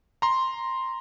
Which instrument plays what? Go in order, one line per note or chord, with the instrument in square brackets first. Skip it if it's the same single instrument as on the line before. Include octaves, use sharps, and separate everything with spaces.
[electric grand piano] A#5 C6